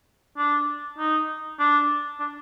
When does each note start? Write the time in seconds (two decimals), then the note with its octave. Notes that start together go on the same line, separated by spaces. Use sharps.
0.37 D4
0.98 D#4
1.59 D4
2.20 D4